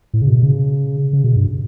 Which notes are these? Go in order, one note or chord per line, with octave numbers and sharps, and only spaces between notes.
A2
C#3
B2
C#3
C#3
B2
G2